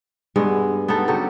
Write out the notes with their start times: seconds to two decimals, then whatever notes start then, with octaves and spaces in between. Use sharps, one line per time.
0.36 G2 G#3 B3
0.88 B3 C4 D#4 A4
1.08 C#3 F#3 G4 A4